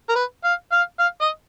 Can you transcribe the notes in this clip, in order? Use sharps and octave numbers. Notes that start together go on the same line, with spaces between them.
A#4
B4
F5
F5
F5
D#5